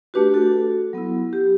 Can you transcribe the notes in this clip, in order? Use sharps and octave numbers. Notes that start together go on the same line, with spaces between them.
A3 D4 F#4 G4 B4
F#4 A4
F#3 B3 E4
G4